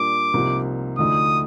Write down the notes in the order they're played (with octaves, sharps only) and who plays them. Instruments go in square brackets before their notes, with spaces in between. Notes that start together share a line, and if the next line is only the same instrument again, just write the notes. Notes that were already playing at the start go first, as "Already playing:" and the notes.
Already playing: [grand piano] A#2 G3 A#3 D4 [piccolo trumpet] D6
[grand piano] C2 C3 F3 A#3 D#4
[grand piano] D2 D3 F3 A3 D#4 [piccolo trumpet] D#6